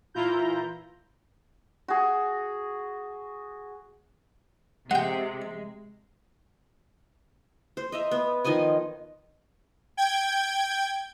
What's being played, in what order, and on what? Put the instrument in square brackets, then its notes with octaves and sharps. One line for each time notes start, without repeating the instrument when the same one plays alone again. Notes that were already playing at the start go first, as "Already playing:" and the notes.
[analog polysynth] A#2 E3 E4 F4 A#5 G6
[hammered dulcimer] F#4 G#4
[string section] C3 [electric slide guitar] G#3 [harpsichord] F#5 G5
[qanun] C5
D#5 E5 A#5
B3
D#3 F3 D#5 G#5
[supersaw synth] G5 G#6